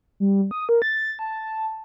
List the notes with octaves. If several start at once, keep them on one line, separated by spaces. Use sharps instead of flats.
G3
D#6
A#4
A6
A5